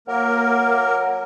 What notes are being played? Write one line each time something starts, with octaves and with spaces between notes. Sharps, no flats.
F#3 A#3 A#4